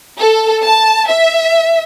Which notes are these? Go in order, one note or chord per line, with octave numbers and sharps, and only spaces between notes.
A4
A5
E5